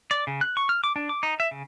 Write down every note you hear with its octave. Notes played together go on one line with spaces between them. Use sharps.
D5
C#3
F#6
C#6
F6
D6
D4
D6
D#4
E5
C#3